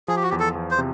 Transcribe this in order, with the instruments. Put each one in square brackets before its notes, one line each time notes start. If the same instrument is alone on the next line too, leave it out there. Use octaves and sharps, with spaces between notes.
[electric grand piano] F3 [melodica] G#4
[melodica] G4
F#4
[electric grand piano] E2 [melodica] G4
[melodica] A4
[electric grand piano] E2
[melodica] C5
[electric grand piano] C3